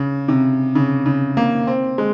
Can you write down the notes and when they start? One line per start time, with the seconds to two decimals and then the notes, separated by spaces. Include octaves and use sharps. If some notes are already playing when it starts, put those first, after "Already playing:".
Already playing: C#3
0.28 C3
0.75 C#3
1.06 C#3
1.37 A#3
1.67 C4
1.98 G#3